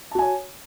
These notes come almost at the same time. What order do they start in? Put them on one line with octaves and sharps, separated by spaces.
A5 F#4 G#5 C#5